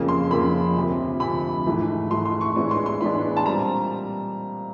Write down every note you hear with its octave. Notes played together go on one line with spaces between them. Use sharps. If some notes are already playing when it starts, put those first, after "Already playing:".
Already playing: F2 C#3 F3 A#3
C6
F2 C#3 F3 A#3 B5
D2 C3 F3
D2 C3 F3 B5
G#2 E3 A3
G#2 E3 A3 C6
C6
C#6
A2 E3 G#3 B3 D4 C#6
C6
C6
A2 E3 G#3 B3 D4 B5
A5
A#2 G3 C4 A#5